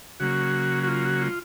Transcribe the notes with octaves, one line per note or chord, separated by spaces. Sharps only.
C#3 F#3 A#3 F#4
F#4
F4
F#4
F4